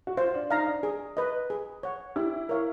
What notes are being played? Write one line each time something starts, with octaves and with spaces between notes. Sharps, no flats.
F#4
F4 C5
D4
D#4 F5 A#5
D4
G#4
B4 D#5
G#4
C#5 F#5
E4 G4
A#4 C#5 F5